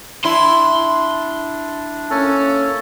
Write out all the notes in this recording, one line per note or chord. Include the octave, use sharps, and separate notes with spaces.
D4 E4 C6
A#3 C#4 A4